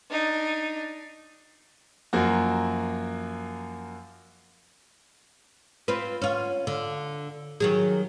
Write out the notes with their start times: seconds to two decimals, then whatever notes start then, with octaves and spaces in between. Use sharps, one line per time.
0.10 D4 D#4
2.13 F#2 F3 A#3 F#4
5.88 C4 F4 B4
6.22 C#4 F4
6.67 D3
7.60 D#3 F#3 G#4